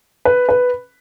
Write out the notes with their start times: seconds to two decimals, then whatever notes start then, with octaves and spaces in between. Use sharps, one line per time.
0.25 B4
0.49 B4